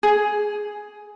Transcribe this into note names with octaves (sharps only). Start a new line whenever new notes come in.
G#4